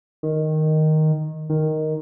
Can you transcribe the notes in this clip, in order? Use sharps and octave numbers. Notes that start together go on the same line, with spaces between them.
D#3
D#3